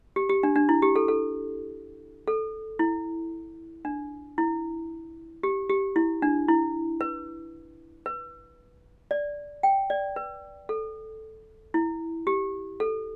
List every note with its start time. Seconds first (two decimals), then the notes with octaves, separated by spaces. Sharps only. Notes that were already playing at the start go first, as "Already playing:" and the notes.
0.16 G4
0.29 G4
0.43 D4
0.56 D4
0.69 E4
0.82 G4
0.96 A4
1.08 A4
2.28 A4
2.79 E4
3.85 D4
4.38 E4
5.43 G4
5.70 G4
5.96 E4
6.22 D4
6.48 E4
7.01 B4
8.06 B4
9.11 D5
9.63 G5
9.90 D5
10.16 B4
10.69 A4
11.74 E4
12.27 G4
12.80 A4